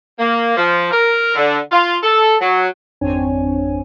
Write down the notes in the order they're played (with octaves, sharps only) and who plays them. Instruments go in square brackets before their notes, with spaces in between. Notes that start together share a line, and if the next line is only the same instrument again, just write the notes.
[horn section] A#3
F3
A#4
D3
F4
A4
F#3
[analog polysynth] G#1 F2 C4 D4 C#5 G#5